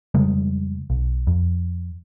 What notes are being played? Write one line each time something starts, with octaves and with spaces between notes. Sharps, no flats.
F2 C#3 G3 G#3
B1
F2